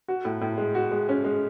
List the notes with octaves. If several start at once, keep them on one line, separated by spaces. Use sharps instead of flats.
F#4
A2
A2
G#3
F#4
G#3
C#4
G#3